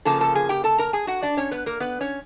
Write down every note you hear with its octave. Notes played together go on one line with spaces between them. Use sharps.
C#3 F3 A#3 A4 A5
A4 A5
G#4 G#5
G4 G5
A4 A5
A#4 A#5
G#4 G#5
F#4 F#5
D4 D5
C#4 C#5
B3 B4
A#3 A#4
B3 B4
C#4 C#5